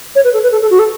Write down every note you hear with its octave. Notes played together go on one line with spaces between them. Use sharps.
C#5
B4
A4
B4
A4
A4
F#4
A4